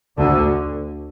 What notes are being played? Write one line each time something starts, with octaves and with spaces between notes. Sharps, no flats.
D2 D3